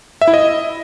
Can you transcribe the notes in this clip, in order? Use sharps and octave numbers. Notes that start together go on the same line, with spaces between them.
E5
E4
D#5